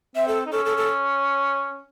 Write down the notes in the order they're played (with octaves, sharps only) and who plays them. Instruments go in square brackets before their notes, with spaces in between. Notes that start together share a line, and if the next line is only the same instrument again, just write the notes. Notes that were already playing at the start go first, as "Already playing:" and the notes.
[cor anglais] C4 [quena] E5
[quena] A4
[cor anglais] D#4
[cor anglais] C#4 [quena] A4
[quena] A4
A4